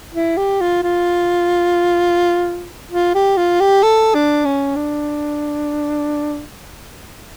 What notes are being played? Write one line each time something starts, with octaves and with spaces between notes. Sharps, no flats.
E4
G4
F4
F4
F4
G4
F4
G4
A4
D4
C#4
D4